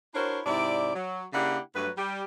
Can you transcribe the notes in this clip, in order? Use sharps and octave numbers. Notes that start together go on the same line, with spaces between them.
D4 E4 F#4 A#4 C5 C#5
G#2 C3 E4 D5
F#3
C#3 A#3 D4 E4 G4 F#5
G2 F#3 A3 B4
G3 G4